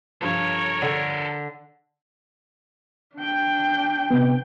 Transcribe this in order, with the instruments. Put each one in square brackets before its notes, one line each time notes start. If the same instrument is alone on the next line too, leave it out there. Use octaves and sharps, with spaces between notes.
[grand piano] G2 F3 [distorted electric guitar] A4 A#4 [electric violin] C#5
[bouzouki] D3
[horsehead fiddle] D4 G5
[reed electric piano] C3 B3